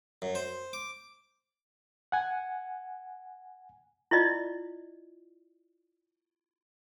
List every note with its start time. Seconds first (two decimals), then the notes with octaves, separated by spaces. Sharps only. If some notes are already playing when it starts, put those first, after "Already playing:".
0.22 F#2
0.35 C5
0.73 D6
2.12 F#5 G#5
4.11 E4 F4 D5 D#5